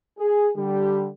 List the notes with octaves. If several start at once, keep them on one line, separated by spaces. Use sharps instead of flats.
G#4
D3 G3 G4